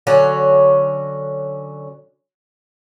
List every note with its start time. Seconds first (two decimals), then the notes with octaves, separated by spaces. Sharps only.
0.07 D3 F#3 C#4